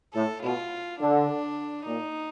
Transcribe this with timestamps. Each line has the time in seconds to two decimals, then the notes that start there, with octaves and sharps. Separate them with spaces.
0.14 A2 A4
0.43 B2 F4
1.01 D3 D4
1.86 A#2 D#4